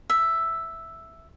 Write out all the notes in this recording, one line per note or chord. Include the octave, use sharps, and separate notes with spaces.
E5